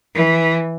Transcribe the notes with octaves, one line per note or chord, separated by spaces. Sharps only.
E3